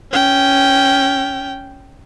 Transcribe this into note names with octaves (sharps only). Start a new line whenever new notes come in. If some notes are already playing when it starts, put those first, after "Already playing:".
C#4 G5